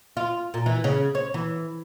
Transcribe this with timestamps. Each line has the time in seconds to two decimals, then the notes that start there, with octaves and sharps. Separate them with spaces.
0.17 F4
0.54 A#2
0.66 E3
0.84 C#3
1.15 C#5
1.34 E3